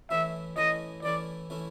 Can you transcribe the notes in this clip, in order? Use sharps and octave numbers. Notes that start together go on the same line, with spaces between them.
E3 A3 C#4 E4 E5
E3 A3 C#4 E4 D#5
E3 A3 C#4 E4 D5
E3 A3 C#4 E4